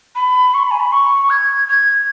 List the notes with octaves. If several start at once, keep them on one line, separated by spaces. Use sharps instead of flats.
B5
C#6
B5
G#5
B5
C#6
G#6
G#6